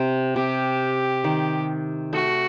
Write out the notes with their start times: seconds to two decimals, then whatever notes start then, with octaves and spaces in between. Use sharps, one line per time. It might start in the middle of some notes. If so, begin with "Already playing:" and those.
Already playing: C3
0.36 C3 G4
1.24 D#3
2.13 A3 F#4